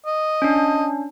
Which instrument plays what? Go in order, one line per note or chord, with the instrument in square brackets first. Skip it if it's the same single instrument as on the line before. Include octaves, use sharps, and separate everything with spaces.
[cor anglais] D#5
[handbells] C#4 D4